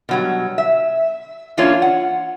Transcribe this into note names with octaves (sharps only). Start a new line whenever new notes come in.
B2 F#3 G3
E5
E3 A#3 C#4 D4 F4 C#5
F#5